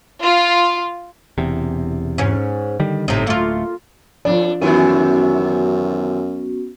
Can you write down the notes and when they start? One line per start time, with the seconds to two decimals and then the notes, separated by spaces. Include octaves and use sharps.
0.21 F4
1.38 E1 E2 C3
2.18 G#2 C#4
2.80 D3 D#3 G3
3.08 G1 A2 C3 D#4
3.27 D1 A3 A#3 F4
4.25 F2 F3 D4 D5
4.62 F#2 C3 D#3 E3 B3 C#4 F#4